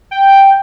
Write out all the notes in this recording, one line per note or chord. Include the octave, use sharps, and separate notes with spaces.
G5